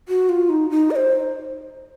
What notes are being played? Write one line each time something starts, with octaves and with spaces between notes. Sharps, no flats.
F#4
F4
D#4
D#4
D#5
C5